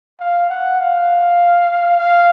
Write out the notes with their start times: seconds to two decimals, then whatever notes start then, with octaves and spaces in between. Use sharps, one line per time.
0.20 F5
0.49 F#5
0.80 F5
1.97 F5